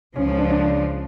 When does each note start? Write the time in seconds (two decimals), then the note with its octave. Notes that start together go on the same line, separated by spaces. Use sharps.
0.16 C#2 C#3 F3 C#4
0.27 C#4
0.38 D4
0.50 D4